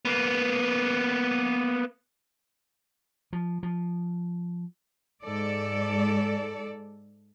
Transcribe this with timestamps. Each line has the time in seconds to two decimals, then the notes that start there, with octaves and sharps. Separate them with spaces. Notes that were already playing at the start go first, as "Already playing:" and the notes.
0.05 A#3 B3
3.33 F3
3.63 F3
5.24 G#2 A4 D5